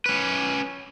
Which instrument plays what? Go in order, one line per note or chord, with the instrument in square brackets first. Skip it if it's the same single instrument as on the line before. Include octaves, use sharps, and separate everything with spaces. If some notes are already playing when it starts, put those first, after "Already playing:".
[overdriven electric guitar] C#4 B4